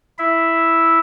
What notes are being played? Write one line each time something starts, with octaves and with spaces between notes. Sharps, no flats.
E4 E5